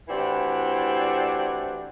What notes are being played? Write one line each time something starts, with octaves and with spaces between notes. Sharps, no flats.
A2 E3 C4 D4 F#4 G4